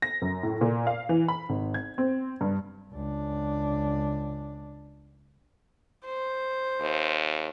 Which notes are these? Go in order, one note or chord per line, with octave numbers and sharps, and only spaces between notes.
A#6
F#2
A2
A#2
F5
E3
B5
G#1
G#6
C4
G2
C#2 D4
C5
D#2